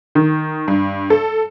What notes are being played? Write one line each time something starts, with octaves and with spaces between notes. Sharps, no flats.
D#3
G2
A4